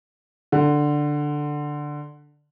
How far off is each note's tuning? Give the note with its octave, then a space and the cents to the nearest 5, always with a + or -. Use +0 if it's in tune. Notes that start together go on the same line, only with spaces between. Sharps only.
D3 +5